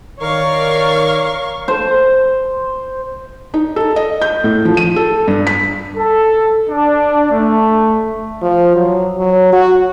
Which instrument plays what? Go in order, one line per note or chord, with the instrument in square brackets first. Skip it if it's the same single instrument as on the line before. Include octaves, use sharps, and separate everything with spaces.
[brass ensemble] D#3 D5 [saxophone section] A#4 [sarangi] C#5 [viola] F5 C#6
[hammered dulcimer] C5
[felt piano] D#4
A4
D#5
G6
A2
F3
D#7
A4
G2
B6
[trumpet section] A4
D4
A3
[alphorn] F3
F#3
F#3
F#4